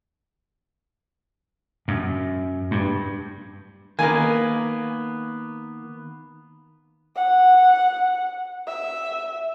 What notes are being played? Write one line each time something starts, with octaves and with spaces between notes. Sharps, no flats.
F#2
G2
D#3 A#3 B3 A#4 G#5
F#5
E5